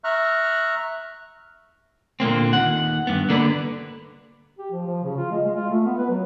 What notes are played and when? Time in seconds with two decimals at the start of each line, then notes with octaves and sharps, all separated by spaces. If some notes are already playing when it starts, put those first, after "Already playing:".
0.04 E5 A#5 C#6 F6 F#6
2.20 A#2 D3 A#3 C4
2.53 D#2 F#5
3.07 G2 B3
3.30 D3 A#3 B4 D5
4.59 G4
4.71 F3
4.86 F3
5.04 C#3
5.17 F4
5.31 G#3
5.44 G#3
5.56 F4
5.70 A3
5.85 B3
5.97 B4
6.09 F#3